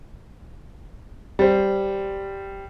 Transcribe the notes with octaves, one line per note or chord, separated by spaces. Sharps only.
G3 C5